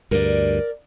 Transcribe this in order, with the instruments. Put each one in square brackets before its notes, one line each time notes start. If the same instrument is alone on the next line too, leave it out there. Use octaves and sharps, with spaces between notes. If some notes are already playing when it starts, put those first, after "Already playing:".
[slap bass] D2 G2 [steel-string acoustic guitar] A#4 D5